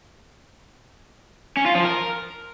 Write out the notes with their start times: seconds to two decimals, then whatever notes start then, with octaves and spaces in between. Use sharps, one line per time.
1.57 C#4
1.66 F4
1.75 F3
1.84 A#4